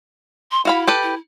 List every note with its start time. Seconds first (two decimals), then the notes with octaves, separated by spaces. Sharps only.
0.51 C6
0.65 E4 F#4 F5 B5
0.87 G4 A4 B4
1.03 E4